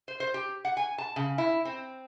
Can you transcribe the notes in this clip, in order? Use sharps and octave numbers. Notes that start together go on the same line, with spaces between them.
C5
C5
G4
F#5
G#5
A5
C#3
E4
C4